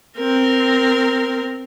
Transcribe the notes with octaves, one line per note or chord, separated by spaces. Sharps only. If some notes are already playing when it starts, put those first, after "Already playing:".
C4 A#4